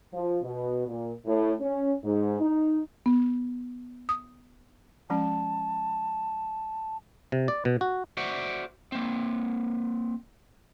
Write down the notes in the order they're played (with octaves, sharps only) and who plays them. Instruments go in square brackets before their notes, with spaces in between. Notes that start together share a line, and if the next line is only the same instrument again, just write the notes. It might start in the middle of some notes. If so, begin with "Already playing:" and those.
[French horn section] F3
B2
A#2
A2
C#4
G#2
D#4
[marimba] B3
D#6
[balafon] F3 G#3 C#4 [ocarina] A5
[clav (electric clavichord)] C3
D5
B2
F#4
[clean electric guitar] F#4 C5 D5 E5 F#5
A#3 C4